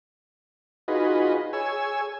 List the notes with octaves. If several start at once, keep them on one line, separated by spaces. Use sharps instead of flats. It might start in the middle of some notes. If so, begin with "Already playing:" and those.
D#4 F4 F#4 G#4 B4 D#5
G#4 C#5 G#5 E6